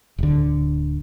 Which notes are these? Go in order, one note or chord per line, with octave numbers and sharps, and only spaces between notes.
D1 D3